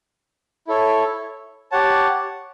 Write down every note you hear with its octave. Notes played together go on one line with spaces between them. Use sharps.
E4 A4 C#5
G4 C#5 F#5 A5